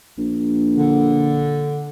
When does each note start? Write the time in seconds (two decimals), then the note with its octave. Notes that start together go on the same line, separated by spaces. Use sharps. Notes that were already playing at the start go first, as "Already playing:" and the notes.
0.18 A#1
0.77 D3